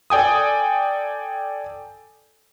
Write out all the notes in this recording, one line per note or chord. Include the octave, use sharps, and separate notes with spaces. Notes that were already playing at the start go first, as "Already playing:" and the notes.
A4 D5 G5 G#5 D#6